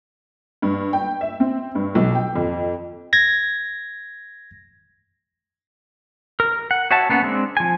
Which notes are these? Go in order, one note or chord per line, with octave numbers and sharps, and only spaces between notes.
G2
G5
E5
C4
G2
B1
G5
F2
G#6 A#6
A#4
F#5
F#4 C#5 E5 F#5 A5
A#3 B3 C#4 F#5
G#3 C4 D4
F3 G#5